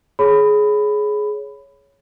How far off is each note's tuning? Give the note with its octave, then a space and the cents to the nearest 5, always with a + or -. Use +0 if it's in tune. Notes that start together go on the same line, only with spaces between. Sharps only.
G#4 +15 C#5 +0 B5 +10